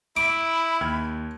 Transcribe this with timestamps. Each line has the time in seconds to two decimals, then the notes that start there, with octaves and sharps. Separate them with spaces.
0.17 E4 B5 D6
0.81 D#2 F6 G#6